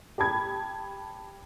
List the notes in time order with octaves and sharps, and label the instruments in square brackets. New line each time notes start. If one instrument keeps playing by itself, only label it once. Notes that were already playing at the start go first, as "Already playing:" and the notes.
[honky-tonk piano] G4 A5 B5 G#6